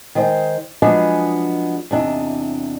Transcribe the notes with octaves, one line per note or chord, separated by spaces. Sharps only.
D#3 G#3 C5 D5 G5
F3 F#3 G#3 B3 D4 G#4
E2 C3 D4 D#4